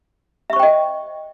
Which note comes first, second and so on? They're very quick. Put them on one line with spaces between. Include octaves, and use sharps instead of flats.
E5 C#6 C5 G5 D#5